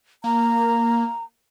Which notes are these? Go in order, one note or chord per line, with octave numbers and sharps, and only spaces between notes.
A#3 A#5